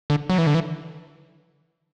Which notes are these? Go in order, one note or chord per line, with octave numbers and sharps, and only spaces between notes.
D3
F#3
E3
D3
E3